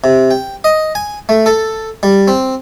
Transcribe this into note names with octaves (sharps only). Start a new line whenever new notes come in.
C3
G5
D#5
G#5
A3
A4
G3
C4